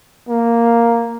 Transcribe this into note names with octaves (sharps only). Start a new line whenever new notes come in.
A#3